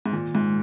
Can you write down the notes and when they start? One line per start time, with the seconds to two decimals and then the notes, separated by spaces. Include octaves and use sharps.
0.06 G#2
0.13 A#2 D#3
0.35 G#2 G#3